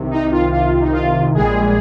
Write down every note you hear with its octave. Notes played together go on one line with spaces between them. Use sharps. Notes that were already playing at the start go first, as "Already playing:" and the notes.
Already playing: C2 C3 D#3
D#4
F4
F4
D#4
F4
A#1 A#2 G3 G#3 G#4